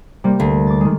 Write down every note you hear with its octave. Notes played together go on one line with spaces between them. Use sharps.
C3 G3 A#3
D2
D6 A6
D#3 G#3